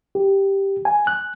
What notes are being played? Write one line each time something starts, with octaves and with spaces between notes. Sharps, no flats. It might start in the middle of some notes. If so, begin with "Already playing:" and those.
G4
G#5
F#6